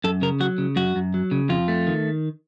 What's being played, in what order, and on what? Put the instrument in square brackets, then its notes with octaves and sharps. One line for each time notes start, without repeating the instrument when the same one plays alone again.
[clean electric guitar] F#2 A4
C#3 A#4
F#3 F#4
C#3
F#2 F#4
F#2
F#3
C#3
F2 F4
A3
D#3